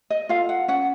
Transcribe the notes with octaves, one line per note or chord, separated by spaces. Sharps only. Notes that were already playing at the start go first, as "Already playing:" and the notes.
D#5
F4 A4 F5
F#5
C#4 F#5